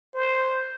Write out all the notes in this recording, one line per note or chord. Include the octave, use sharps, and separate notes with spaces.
C5